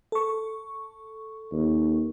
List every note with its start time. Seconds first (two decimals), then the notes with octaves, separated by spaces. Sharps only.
0.12 A4 C#6
1.52 D#2